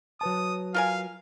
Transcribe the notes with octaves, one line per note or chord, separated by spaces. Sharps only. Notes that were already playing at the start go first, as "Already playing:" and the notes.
F#3 B4 A5 D#6
F4 A#4 F5 G#5